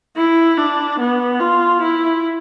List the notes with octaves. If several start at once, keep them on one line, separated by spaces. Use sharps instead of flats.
E4
D4
B3
F4
E4